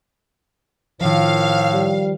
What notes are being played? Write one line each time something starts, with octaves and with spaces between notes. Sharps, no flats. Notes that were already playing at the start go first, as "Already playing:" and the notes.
A2 D#3 F3 F5
G3